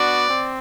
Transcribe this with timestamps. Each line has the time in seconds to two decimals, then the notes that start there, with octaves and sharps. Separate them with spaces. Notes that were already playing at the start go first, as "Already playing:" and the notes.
Already playing: B3 D4 F#4 D5
0.29 C4